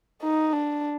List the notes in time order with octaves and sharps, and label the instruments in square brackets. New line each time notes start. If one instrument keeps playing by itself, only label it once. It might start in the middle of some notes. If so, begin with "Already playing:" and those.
[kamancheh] D#4
D4